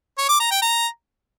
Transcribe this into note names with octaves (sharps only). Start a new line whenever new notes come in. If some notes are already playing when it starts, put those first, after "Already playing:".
C#5
D6
A#5
G5
A#5